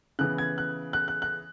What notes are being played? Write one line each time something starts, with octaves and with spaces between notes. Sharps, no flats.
C#3 E3 B3 F#6
G#6
F#6
F#6
F#6
F#6